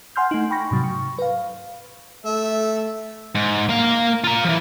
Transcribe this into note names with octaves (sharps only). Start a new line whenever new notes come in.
F#5 G#5 C6 F6 G6
A3 D#4
G5 B5 C#6 A#6
G#2 C3 F#3
C#6
B4 F5
A3 E5
G#2
A#3 F5
F4 A#5
E3 F3